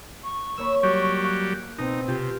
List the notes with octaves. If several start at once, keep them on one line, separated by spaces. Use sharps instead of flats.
C#6
A#3 C#5 B5 E6
F#3 G3 G4
F5 F#6
B2 C4 D#4
C3 F4 G4